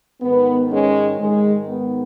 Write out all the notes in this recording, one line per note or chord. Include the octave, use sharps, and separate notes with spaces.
G#2 D#3 B3
G#3 C#4
G#2 D#3 G#3
B3